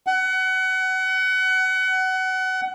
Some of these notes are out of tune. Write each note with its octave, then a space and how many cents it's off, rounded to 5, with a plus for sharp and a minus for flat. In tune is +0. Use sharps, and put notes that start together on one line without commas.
F#5 +25